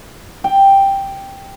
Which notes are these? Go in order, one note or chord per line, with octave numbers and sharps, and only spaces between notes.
G5